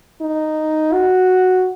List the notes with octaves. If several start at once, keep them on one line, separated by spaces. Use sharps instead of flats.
D#4
F#4